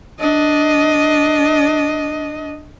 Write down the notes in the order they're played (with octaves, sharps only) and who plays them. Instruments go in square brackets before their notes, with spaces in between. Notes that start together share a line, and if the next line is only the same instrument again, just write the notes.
[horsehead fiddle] D4 D#5